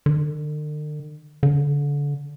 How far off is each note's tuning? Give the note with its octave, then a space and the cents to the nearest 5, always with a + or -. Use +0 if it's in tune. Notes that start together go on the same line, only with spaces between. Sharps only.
D3 +45
D3 -30